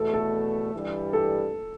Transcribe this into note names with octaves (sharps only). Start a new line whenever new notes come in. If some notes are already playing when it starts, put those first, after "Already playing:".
Already playing: E2 B2 A3 A4
A4
G2 E3 G3
A4